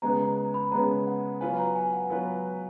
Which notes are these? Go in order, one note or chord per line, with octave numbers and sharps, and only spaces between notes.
C#3 G#3 B3 A#5
A#5
A#5
B5
C#3 G#3 B3 A#5
F#5
F#3 B3 F4 B4 G#5
A#5
G#5
F#5
F#3 B3 F4 B4